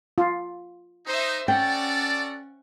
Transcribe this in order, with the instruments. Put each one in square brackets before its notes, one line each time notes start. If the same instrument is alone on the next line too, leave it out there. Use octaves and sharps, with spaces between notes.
[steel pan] F4
[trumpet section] D#4 [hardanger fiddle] C5 E5
[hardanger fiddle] C#4 F#5 [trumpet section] F#4 A4 D5 [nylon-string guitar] G5